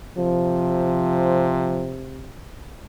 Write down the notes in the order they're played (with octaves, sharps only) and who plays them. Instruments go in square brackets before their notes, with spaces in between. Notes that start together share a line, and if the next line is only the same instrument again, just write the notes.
[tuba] C3 [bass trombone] F3